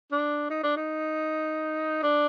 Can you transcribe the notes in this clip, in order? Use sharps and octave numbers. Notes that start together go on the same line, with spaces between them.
D4
D#4
D4
D#4
D4